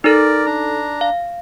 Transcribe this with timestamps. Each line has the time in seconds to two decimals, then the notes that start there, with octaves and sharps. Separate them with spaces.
0.04 D#4 A4 A#4 D5
0.46 D4 A#5
1.01 F5